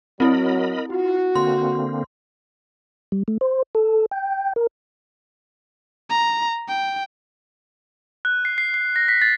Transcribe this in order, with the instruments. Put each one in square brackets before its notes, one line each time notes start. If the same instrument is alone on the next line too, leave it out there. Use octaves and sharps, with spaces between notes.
[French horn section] F#3 [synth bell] C4 E4 [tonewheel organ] A#4 D#5 B5
[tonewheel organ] F4 [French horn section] F#4
[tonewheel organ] D3 A#3 C4 [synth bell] C6
[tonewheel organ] G3
A3
C5
A4
G5
A#4
[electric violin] A#5
G5
[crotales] F#6
C7
C7
C7
A#6
B6
A6